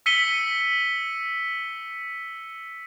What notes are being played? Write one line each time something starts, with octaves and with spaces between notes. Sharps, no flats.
E6 B6 C#7 D#7 G7